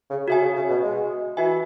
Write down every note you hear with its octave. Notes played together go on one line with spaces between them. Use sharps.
C#3
C#3 F#4 E5 G#5
C#3
C#3
B2
G#3
E3 F#4 E5 G#5